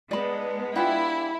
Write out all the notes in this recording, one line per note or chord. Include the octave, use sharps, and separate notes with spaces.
G#3 B3 D#4 A4 D5 B5
D4 E4 F4 G4 E5 F#5 G#5